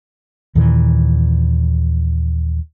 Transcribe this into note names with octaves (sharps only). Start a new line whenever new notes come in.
D#2 A#2 D#3 E3